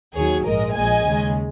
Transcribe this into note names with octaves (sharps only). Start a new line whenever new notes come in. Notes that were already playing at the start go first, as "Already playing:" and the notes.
D#2 D#3 F#3 G#4 C#5
A#1 G#2 G#3 A#4 D#5
A#1 A#2 G#3 D#5 G#5
D#2 C#3 G#3